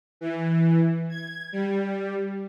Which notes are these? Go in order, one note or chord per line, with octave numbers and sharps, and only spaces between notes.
E3
G#6
G3